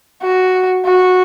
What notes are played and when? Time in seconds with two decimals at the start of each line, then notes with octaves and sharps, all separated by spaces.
0.22 F#4
0.85 F#4